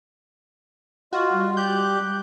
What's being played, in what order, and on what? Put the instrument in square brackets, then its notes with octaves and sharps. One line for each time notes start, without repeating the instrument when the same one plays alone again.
[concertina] F4 [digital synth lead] F#4 [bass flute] D#5
[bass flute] G3
[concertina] G4 F#6 [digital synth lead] G6